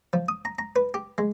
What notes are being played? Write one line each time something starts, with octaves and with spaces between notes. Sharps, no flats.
F3
D#6
A#5
A#5
B4
G4
G#3